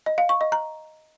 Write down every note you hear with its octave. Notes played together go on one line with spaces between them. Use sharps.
D#5
F5
C#6
D#5
A#5